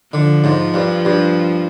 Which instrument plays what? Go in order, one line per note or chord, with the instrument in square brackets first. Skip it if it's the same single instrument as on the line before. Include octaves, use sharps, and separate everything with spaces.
[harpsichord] D3 [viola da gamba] F3
[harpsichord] G#2
G2
G2